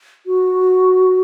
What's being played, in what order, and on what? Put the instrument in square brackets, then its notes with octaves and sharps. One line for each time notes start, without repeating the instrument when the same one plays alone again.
[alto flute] F#4